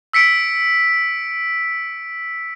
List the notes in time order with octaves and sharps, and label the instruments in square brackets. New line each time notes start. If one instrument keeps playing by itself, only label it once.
[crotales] E6 B6 C#7 D7